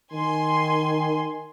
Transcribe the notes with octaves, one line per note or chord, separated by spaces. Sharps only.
D#3 G#5 C6